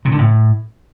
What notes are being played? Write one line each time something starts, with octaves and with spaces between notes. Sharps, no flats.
C3
D3
A2